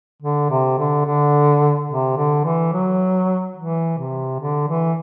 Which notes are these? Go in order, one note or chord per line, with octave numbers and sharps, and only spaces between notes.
D3
C3
D3
D3
C3
D3
E3
F#3
E3
C3
D3
E3